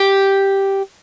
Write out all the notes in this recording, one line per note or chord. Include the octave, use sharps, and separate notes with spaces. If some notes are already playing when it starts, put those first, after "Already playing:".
Already playing: G4